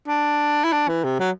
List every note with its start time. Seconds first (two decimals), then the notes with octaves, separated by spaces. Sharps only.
0.08 D4
0.64 E4
0.72 D4
0.88 E3
1.04 C3
1.20 F#3